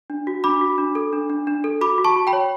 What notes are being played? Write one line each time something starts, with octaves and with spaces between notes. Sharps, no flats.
D4
F#4
D4 B5 D6
F#4
D4
A4
D4
D4
D4
A4
F#4 B5 D6
F#4
A5 C#6
F#4
G5 B5
C#5